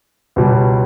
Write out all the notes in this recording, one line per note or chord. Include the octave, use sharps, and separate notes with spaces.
C#2 B2 G3